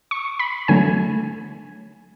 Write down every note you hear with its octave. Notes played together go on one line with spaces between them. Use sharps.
C#6
B5
D3 F#3 A3 G#5